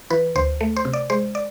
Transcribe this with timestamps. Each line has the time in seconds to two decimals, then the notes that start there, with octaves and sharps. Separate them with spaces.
0.10 E3 B4
0.36 D2 C5
0.61 A3
0.77 C5
0.85 C3
0.93 D5
1.10 G#3 C5
1.35 D5